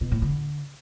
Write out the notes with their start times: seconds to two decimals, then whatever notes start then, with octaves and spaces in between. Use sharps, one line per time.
0.01 B2
0.12 A2
0.22 D3